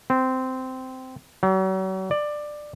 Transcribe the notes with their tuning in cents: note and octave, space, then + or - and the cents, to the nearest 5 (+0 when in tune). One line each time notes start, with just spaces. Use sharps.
C4 -15
F#3 +40
D5 +15